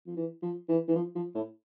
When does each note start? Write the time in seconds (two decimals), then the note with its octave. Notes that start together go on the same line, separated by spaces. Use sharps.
0.07 F3
0.16 E3
0.42 F3
0.68 E3
0.88 E3
0.95 F3
1.15 F3
1.35 A2